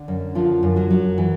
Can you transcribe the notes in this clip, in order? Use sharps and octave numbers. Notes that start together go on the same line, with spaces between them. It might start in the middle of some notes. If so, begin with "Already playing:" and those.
Already playing: D3
F#2
D3 F3 F4
F#2
F#3 F#4
F#3
E3